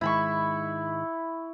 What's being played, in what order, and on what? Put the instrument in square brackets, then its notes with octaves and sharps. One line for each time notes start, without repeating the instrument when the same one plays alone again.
[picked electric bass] G#2 D#3 G#3 [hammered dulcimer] E4 B5 C#6